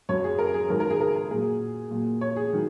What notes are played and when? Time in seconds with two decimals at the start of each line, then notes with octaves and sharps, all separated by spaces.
0.09 F#2 F#3 C#5
0.24 G#4
0.39 A#4
0.54 G#4
0.70 G#2 D#3 F#3 A#4
0.80 A#4
0.90 G#4
1.00 A#4
1.15 A#4
1.30 A#2 F#3 G#4
1.91 A#2 F#3
2.21 C#5
2.36 G#4
2.53 D#3 F#3